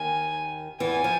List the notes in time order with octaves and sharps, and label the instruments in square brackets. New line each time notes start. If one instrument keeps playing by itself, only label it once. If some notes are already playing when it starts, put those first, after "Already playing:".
Already playing: [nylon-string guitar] D#2 D#3 [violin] G#5
[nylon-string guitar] E2 E3 [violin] G#5
[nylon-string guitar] F3